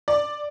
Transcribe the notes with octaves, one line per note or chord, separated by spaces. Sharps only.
D5